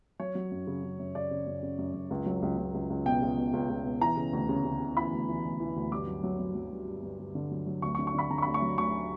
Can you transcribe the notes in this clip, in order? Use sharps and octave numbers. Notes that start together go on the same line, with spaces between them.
F#3 C#5
F#3
F#2
C#3
C#3
F#2
C#3 D5
C#3
F#2
C#3
F#2
F#2
C#2
F#3
C#2
C#2
C#2
C#2
B2 G5
C#2
B2
C#2
C#2
B2
E3 A#5
C#3
D2
C#3
C#3
C#3
E3 B5
D2
E3
D2
E3
D2
G2 D6
F#3
F#3
F#3
F#3
G2
G2
G2
G2
D3
F#3
F#3
D2 C#6
C#6
D3
C#6
D3 B5
D3 A#5
C#6
D2 B5
C#6
F#3
D2 C#6